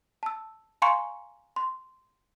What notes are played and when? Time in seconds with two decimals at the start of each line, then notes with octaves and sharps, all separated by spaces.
0.23 A5 E6
0.82 F5 G#5 A#5 C6 C#6 C#7
1.56 C6